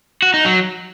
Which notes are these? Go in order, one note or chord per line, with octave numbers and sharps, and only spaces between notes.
F#4
D#4
F#3